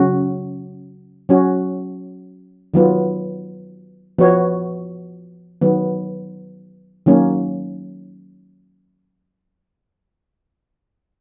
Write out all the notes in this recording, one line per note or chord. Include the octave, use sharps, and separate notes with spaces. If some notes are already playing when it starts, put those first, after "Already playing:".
Already playing: C#3 F#3 C#4 F#4
F#3 C#4 F#4
D#3 F#3 B3 F4
F3 B3 F#4 C#5
D#3 F#3 B3
D#3 F#3 A#3 C#4